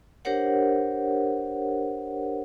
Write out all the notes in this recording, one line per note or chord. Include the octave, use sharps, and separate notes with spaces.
D4 G4 A#4 C5 C#5 F#5